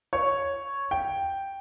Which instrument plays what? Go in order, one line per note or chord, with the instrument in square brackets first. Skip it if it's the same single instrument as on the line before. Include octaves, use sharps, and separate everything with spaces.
[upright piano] C#5
G5